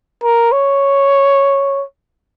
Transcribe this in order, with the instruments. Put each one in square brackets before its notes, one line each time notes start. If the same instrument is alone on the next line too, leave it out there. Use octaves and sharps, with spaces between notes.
[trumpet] A#4
C#5